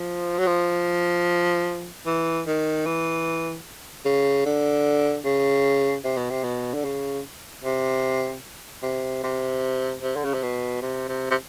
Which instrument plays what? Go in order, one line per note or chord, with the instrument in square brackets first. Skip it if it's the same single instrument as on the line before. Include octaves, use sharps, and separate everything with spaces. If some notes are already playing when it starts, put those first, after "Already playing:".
Already playing: [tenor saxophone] F3
F#3
F3
E3
D#3
E3
C#3
D3
C#3
C3
B2
C3
B2
D3
C#3
C3
C3
C3
C3
D3
C#3
C3
B2
C3
C3
C3